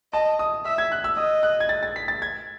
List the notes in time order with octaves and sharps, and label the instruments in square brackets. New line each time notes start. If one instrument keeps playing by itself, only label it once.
[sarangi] D#5 [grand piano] A5
[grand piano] D#6
[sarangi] E5 [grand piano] E6
[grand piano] G#6
F#6
E6
[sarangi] D#5 [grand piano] D#6
[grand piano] F#6
G#6
A6
A6
B6
A6
G#6